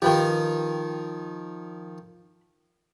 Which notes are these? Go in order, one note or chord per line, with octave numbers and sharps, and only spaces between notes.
D#3 F3 G4 B4 G5